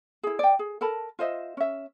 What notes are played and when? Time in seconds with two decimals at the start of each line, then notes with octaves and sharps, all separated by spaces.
0.23 E4 G#4
0.39 D5 G5
0.59 G#4
0.81 A4 A#4 A5 B5
1.19 F4 C5 D#5 E5
1.57 C#4 E5